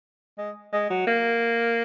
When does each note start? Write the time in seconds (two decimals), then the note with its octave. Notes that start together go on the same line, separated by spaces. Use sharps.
0.38 G#3
0.73 G#3
0.90 F#3
1.07 A#3